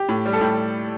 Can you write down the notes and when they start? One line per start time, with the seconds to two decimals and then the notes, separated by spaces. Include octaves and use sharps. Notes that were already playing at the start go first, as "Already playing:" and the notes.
Already playing: G4
0.09 A2
0.26 G3
0.33 A4
0.41 A2 G4